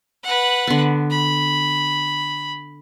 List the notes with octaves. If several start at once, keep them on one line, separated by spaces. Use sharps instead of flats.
B4 F#5
D3 B3
B5